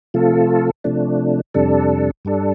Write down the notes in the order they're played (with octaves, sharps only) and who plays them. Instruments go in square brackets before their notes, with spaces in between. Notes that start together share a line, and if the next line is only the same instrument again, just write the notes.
[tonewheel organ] C3 F3 A3 F4 A4
C3 F3 A3 D4
F2 C3 G3 D4 A4
G2 G3 D4 A4